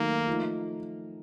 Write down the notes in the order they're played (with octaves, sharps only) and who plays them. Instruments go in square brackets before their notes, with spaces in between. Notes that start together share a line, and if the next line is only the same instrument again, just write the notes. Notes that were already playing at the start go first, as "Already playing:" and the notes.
Already playing: [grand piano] D#3 F#3 A3 D#4 A#4 [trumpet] A#3
[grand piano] F3 A3 D#4